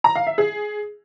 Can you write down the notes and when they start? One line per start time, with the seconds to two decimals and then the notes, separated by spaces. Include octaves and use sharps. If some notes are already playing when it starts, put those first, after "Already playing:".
0.04 A#5
0.16 F5
0.27 E5
0.38 G#4